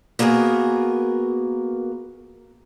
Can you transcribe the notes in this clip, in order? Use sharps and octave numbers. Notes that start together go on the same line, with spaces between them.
A#3 B3 F#4 G#4 A#4